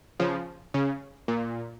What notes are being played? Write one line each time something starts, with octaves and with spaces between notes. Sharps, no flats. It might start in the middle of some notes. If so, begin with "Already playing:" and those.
C#3 F3
C#3
A#2